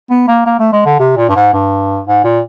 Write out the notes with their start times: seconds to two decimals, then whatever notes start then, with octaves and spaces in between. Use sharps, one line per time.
0.11 B3
0.28 A#3
0.46 A#3
0.60 A3
0.73 G#3
0.86 D3
1.00 C3
1.17 A#2
1.29 G2
1.36 G#2
1.53 G2
2.07 G#2
2.24 A#2